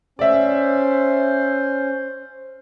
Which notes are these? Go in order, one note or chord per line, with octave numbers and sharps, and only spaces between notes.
C#4 C5 D5 E5